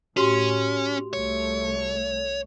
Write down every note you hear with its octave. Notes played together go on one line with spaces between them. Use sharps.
A2 C#4 F#4 G4 C6
C2 A3 C#5